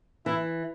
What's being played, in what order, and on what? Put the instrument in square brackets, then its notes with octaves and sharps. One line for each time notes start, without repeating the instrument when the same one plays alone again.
[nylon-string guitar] E3 [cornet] E4